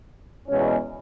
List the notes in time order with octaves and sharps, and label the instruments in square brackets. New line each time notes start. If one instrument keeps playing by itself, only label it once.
[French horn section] E2 B2 G#3 C#4